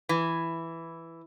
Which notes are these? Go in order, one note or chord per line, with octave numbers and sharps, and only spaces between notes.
E3